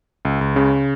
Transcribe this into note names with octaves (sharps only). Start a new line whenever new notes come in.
C#2
C#2
C#3